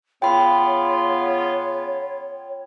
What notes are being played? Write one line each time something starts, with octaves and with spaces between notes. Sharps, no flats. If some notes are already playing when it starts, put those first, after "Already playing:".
C#3 B3 F4 C#5 G5 B5